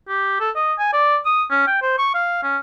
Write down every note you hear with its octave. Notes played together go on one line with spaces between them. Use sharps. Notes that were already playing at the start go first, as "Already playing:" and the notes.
G4
A4
D#5
G#5
D5
D#6
C#4
G5
C5
C#6
F5
C#4